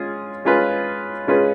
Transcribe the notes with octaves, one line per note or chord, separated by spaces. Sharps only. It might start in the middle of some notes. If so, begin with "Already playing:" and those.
Already playing: G#3 C#4 F4 G#4
G#3 C#4 F4 G#4 B4
G#3 C#4 F4 G#4 B4